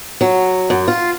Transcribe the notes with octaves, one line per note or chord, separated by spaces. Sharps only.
F#3
F#2
F4